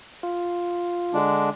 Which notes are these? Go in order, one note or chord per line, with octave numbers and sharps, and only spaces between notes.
F4
D3 G#3 D4